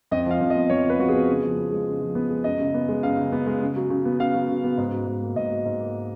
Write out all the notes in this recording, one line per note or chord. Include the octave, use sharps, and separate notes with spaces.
F2 D#5
F3 F5
F2
D#5
B3
F2 C#5
F3
B4
F2 F#4
B3 G#4
C#3
F3
B3
G#3
C#3
F3
B3
G#3
F#2 D#5
C#3
B3
G#3
F#2 F5
C#3
B3
G#3
C#3
F#3
C#3
B3
C#3 F5
F#3
C#3
B3
G#2
F#3
G#2
A#3
G#2 D#5
F#3
G#2
A#3